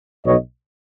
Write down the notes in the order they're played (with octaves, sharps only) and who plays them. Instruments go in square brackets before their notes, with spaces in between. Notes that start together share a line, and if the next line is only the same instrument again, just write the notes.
[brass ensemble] B1 B2 C#5 D#5